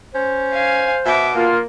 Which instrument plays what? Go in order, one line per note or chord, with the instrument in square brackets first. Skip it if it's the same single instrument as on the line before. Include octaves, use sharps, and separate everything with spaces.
[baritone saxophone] C#4 [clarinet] C5
[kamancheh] F5 G#5
[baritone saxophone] B2 [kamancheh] E5 D6
[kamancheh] A#3 [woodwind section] F4